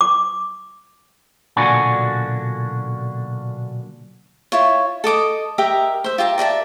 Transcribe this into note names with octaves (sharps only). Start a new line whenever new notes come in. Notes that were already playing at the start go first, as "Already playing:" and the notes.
D6
B1 A#2 D3 D4 F#4 G#5
E4 F4 C#5
A4 D#5 D6 D#6
G4 A#4 D#5 E5
C5 E5
F4 G4 E5 A#5
A#4 D5 E5 A5